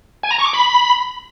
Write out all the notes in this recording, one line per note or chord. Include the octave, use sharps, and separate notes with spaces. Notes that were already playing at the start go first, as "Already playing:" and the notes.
G#5
A#5
C#6
D6
B5